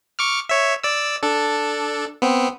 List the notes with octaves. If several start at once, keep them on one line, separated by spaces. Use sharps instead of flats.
C#6 D6 F6
C#5 E5
D5 E6
D4 A4
B3 C4